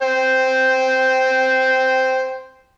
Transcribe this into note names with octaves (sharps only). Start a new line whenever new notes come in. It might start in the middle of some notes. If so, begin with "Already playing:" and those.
C5 G5